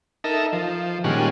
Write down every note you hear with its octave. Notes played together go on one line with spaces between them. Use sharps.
D#4 A4 A#4 E5
F3
A#2 D#3 G3 G#3 C#4 F#5